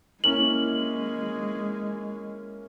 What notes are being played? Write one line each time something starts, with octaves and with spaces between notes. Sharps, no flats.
G#3 A#3 C#4 E4 F#7